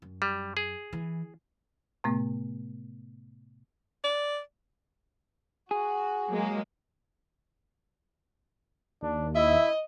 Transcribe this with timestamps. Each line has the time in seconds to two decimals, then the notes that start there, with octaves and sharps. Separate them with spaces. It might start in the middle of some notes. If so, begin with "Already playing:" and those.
0.02 F#2
0.22 G3
0.57 G#4
0.93 E3
2.04 A2 C3 A3 B3
4.04 D5
5.71 F#4 G#4
6.31 F#3 G#3 A#3
9.03 D#2 D4
9.35 E4 D#5 E5